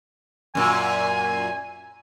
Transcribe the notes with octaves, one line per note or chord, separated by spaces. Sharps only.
F#2 A#2 G#5